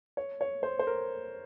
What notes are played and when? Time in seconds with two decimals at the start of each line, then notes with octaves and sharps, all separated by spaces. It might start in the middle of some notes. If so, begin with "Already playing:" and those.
0.17 C#5
0.41 C#5
0.63 C5
0.79 C5
0.87 A#4